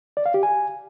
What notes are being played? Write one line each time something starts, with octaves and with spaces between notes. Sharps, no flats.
D5
F5
G4
G#5